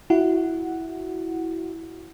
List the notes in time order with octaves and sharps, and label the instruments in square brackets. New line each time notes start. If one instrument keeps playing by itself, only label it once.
[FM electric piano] E4 F#4 F#5